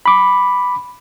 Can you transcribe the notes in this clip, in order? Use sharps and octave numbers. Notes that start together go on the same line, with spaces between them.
B5 D6